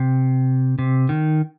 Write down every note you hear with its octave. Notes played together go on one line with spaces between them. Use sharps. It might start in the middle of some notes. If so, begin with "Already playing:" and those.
Already playing: C3
C3
D#3